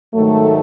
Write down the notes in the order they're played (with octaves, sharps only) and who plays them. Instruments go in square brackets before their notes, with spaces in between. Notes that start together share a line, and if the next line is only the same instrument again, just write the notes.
[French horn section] G#2 D#3 F#3 A3